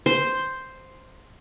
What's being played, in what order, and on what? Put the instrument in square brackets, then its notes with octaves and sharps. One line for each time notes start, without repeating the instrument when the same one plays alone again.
[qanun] C5